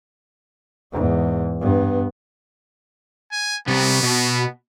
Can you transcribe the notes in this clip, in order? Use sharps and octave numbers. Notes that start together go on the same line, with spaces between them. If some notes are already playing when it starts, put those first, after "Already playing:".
E2 G#2
G2 B3
G#5
C3 G3 B3
B2